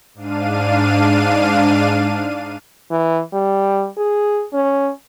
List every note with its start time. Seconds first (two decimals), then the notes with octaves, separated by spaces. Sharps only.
0.14 G#2 D4 F5 D#7
2.91 E3
3.33 G3
3.97 G#4
4.53 C#4